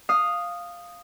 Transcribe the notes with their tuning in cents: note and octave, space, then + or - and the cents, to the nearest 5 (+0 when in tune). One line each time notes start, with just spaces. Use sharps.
F5 +0 D#6 -5